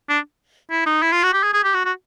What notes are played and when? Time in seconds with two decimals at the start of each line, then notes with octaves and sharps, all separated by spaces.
0.09 D4
0.71 E4
0.86 D#4
1.02 E4
1.12 F4
1.23 F#4
1.33 G4
1.44 G#4
1.54 G#4
1.64 G4
1.74 F#4
1.85 F#4